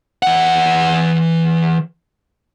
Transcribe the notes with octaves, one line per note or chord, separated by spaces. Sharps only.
E3 F#5